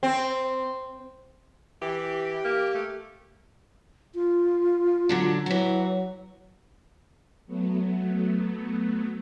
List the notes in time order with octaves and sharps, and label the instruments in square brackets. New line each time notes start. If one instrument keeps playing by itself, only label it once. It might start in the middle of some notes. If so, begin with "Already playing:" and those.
[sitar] C4
[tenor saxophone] E3 [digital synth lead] G4
[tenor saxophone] A#3
A3
[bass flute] F4
[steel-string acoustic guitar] D3 F#3 D4
[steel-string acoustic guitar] E3 F#4 [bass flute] F#3
[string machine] F#3 A3 B3